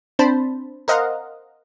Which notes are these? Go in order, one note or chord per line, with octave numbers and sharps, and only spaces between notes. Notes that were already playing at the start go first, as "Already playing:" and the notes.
C4 D4 C5 A5 B5
A#4 C5 D#5 F5 F#5 A#5